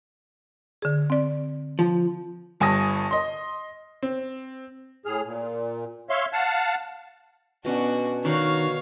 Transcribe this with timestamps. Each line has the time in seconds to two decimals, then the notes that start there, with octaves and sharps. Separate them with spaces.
0.82 D3 G#4
1.10 C4 D5
1.79 F3
2.60 G1 G2 G#5 A5 D#6 A#6
3.11 D#5 C6
4.03 C4
5.06 A2 G#4 F6
5.25 A#2
6.10 C#5 E5 F5 C6
6.33 F5 F#5 A5
7.65 B2 C#4 D4 F#4
8.25 D#3 D4 F#4 C#5 F5